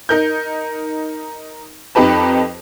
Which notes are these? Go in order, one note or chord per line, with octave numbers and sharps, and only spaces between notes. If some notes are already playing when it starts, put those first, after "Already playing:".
D#4 A#4 G6
F2 D#4 G4 B4 A5